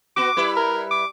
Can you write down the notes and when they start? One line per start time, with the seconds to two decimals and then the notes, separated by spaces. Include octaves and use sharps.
0.17 B3 F#4 D6
0.36 G3 E4 B4
0.57 A#4
0.91 D6